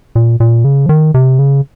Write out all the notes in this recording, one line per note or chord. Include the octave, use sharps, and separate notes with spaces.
A#2
A#2
C#3
F3
D#3
C3
C#3